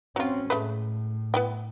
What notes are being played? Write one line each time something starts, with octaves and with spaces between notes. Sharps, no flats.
F#3 C4 C#4 F4
A2 G#3 A3 B4
B3 E4 G5